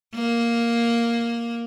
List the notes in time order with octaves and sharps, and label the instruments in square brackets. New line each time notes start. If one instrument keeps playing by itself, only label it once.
[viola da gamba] A#3